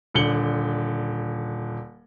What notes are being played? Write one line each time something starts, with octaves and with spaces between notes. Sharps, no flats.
D#1 D3 C#7 F#7 G7